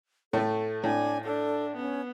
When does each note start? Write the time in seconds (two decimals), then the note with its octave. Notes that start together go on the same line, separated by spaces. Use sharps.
0.33 A2 A3 A4
0.84 A2 D4 G#5
1.24 D4 A4
1.76 B3 C#4